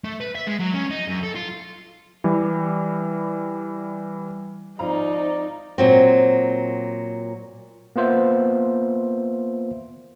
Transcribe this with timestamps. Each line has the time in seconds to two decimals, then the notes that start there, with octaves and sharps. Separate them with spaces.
0.04 A3
0.21 B4
0.35 E5
0.47 G#3
0.59 F#3
0.73 C#4
0.90 D#4
1.08 F#2
1.23 A4
1.35 F4
2.24 E3 G3
4.79 G#1 F3 D#4 D5 F5 A#5
5.78 A#2 F#3 C4
7.96 A#3 B3 F4 C5 E5